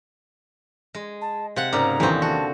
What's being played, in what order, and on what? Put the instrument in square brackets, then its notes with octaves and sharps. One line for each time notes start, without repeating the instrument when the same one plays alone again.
[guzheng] G#3
[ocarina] A5
[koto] C3 F#5 [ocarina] F5
[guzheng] G#2 C#3 A#3 [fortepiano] D5 D6 [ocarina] A#5
[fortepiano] D#2 C#6 D#6 [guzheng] D3 [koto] E3 C4
[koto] F#4 [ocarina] A5